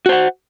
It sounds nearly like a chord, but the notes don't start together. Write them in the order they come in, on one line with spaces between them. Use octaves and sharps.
F#4 C5 F#5